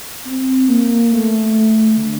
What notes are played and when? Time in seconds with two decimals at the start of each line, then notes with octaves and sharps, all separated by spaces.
0.25 C4
0.68 A#3
1.11 A3
1.97 D3